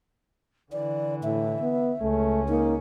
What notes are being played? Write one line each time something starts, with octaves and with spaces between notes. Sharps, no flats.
D3 E3 D5
A2 E5
B3
C#2 A3 C#4
A#3 D#4